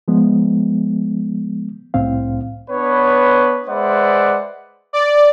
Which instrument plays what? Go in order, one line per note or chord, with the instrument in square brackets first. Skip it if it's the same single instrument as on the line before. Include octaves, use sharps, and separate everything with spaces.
[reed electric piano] F3 G#3 B3
C2 A2 C4 F5
[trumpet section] B3 D4 B4 C#5
G#3 B4 C5 D5 E5 F#5
[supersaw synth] D5